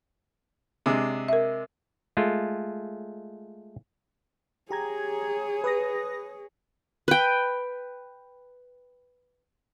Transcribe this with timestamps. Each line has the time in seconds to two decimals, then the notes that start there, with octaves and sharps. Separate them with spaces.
0.86 C3 G#3 D4
1.29 A#4 E5
2.17 G#3 A3 F4
4.71 G4 G#4 C#5 A#5 G#6
5.64 B4 D#6 A#6
7.08 B4 G5